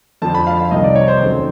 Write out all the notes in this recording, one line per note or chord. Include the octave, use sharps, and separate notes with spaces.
F2 D3 F3 A5
B5
F5
C2 C3 D#3 D#5
D5
C#5
C5
D#2 C#3 F#3 A3 C4